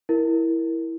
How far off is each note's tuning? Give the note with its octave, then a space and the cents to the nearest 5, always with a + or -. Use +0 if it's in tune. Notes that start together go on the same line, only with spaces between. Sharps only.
E4 +0 A#4 +0